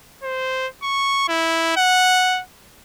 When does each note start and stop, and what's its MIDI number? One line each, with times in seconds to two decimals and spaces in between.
0.23 0.67 72
0.83 1.24 85
1.29 1.75 64
1.77 2.41 78